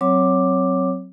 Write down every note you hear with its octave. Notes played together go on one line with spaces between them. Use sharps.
F#3 C4 C#5 D6